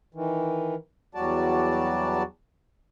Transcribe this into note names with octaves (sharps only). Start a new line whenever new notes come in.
D#3 E3
E2 F#3 G3 F#4 D5 A5